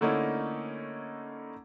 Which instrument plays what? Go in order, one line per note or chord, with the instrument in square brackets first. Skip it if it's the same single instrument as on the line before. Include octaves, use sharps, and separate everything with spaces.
[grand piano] D3 A3 A#3 C#4 D#4 E4